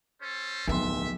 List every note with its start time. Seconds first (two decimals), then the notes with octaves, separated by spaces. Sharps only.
0.21 C#4 A4 C5
0.68 D1 B1 F3 B3 E5 C6